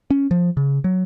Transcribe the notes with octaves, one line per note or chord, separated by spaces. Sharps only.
C#4
F3
C#3
F#3